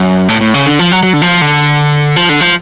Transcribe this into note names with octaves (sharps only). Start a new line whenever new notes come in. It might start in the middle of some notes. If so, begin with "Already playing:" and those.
Already playing: F#2
A2
A2
C#3
D3
F3
F#3
F#3
D3
F3
D3
F3
D3
F3